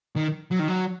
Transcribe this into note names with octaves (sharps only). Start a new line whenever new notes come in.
D#3
F#3
D#3
F#3